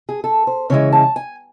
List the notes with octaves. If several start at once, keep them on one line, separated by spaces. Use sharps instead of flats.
G#4
A4
C5
C#3 E3 G#3 C#5
A5
G#5